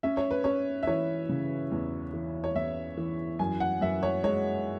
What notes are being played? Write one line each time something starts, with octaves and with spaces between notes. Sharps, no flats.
C#4 E5
C#5
B4
C#4 C#5
E5
E3 C#5
C#3
E2
E3
C#5
E2 E5
E3
F#2 G#5
F#5
F#2 E5
C#5
G#3 C#5